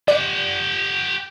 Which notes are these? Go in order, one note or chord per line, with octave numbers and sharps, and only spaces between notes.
G4 D5 F#5